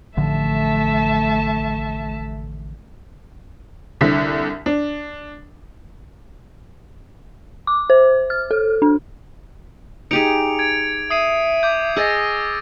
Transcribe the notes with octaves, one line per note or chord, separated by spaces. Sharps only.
A1 D3 F3 A3 E5 A5
C2 D3 B6
D4
D6
C5
F6
A4
D4
D#4 G4 G#4 C#7 D7 F7
G#6 D7
E5 D#6 C7 D#7
D6 G6
G#4 D#5 E6 A6 A#6